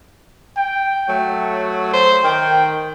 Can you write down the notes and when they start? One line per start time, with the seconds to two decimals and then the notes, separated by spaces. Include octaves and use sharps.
0.57 G5
1.09 F#3 A3
1.93 C5
2.24 D#3 G5